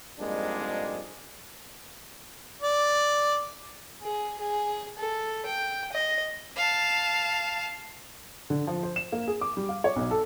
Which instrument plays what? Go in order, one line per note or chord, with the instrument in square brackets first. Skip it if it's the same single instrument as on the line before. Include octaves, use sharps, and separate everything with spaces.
[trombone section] F2 G#2 G3 G#3 A#3 D4
[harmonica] D5
[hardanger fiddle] G#4
G#4
A4
G5
D#5
[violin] F5 A5
[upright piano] D3
F3
C5
E7
A#3
G#4
D6
G3
F5
C#5
B1
A4